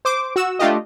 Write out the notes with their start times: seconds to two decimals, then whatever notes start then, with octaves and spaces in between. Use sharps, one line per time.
0.05 C5 D6
0.36 F#4 E6
0.59 A3 D4 F4 G4 D#5